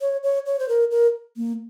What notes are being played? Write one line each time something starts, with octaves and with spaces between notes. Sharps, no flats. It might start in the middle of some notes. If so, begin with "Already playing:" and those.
C#5
C#5
C#5
C5
A#4
A#4
A#3